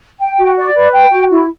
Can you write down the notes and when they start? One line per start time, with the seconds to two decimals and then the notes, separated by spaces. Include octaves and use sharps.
0.19 G5
0.38 F#4
0.56 D5
0.74 B4
0.93 G5
1.12 F#4
1.31 E4